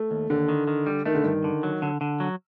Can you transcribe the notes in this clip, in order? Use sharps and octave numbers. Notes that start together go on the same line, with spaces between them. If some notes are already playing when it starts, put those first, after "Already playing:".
Already playing: A3
D#2
D#2 D3
D#3
D#3
G3
D#3 A3
D3
G2 D#3
D3
F#3
D3
D3
F#3